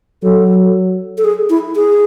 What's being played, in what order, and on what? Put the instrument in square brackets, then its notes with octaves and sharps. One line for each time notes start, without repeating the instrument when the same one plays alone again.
[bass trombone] F#3 [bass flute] A4
[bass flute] A4
G#4
E4
G#4